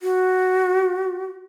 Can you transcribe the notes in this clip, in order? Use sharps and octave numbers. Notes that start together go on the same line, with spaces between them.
F#4